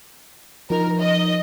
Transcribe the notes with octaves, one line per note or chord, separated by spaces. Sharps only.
F3 D#4 A#4
D#5